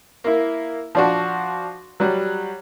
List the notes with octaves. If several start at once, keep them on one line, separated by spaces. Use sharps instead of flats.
A#3 E4
F3 D4 F#4
F#3 G3